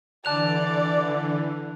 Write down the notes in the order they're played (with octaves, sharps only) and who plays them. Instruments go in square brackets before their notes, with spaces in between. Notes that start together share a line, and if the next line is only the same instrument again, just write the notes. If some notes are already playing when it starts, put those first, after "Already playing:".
[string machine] D3 E3 [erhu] D5 [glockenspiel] A5 F#6 F7